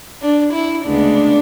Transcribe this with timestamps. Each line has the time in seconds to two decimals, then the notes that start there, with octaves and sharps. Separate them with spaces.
0.21 D4
0.53 E4
0.86 D2 C#3 G#3 B3 D4